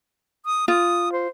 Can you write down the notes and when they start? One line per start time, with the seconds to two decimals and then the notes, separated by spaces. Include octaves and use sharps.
0.46 D#6
0.68 F4 D#6
1.13 C5